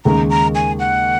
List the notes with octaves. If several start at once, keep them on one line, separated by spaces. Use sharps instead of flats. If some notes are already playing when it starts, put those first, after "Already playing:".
D#2 C#3 G#3 A#5
A#5
G#5
F#5